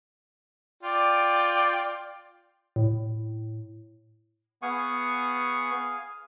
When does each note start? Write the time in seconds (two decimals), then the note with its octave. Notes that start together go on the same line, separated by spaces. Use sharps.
0.83 F4 D5 G5
2.76 A2
4.62 B3 G#4 F5 F#5 G#5 C#6